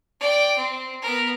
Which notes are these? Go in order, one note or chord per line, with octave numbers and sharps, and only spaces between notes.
D5 G5
C4
B3 A#4